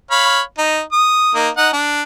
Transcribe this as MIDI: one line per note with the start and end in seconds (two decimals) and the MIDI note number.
0.11 0.41 73
0.11 0.41 77
0.11 0.41 83
0.58 0.80 63
0.92 1.33 87
1.35 1.49 58
1.35 1.49 63
1.57 1.69 63
1.57 1.69 78
1.73 2.02 62